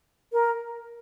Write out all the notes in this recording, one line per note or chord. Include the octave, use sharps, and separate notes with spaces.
A#4